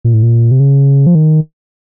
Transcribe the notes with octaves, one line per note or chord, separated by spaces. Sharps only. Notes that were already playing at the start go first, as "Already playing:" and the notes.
A#2
A2
A#2
C3
C#3
F3
D#3